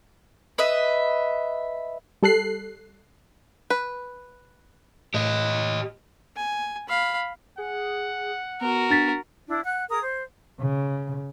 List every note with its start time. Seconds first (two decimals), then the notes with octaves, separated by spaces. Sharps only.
0.58 B4 D#5 E5
2.23 G3 A4 F#6 C7
3.70 B4
5.14 A2 G4 D#5
6.36 G#5
6.89 F5 B5
7.58 G#4 F#5
8.61 B3 F#4 A#4
8.90 D4 A6 B6
9.48 D4 E4
9.63 F#5 F#6
9.89 G#4 A#4 A#5 D#6
10.01 C5
10.60 C#3